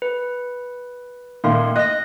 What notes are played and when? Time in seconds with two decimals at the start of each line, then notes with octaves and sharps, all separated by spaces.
0.02 B4
1.44 A#2 D#3 A3 F5 C6
1.76 D#5 F#6 A#6